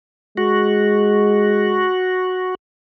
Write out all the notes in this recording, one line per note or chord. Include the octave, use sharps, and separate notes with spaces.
G#3 F#4